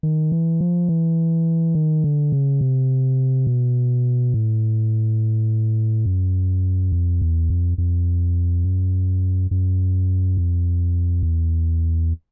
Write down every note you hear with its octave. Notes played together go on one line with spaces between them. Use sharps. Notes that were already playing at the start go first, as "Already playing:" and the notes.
D#3
E3
F3
E3
D#3
D3
C#3
C3
B2
A2
F#2
F2
E2
F2
F2
F#2
F#2
F2
E2